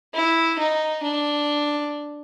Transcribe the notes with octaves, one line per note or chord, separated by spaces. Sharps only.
E4
D#4
D4